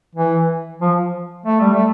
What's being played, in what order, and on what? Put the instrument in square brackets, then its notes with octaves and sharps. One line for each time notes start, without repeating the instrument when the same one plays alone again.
[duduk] E3
F3
A3
G3
A3